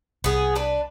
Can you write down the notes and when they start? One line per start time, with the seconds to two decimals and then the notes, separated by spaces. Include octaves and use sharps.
0.24 C2 B3 G#4
0.56 D4 B4